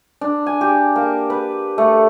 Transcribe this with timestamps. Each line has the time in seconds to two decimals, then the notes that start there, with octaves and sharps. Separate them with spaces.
0.21 D4
0.46 G#5
0.61 G4
0.96 A#3
1.30 B4
1.78 A3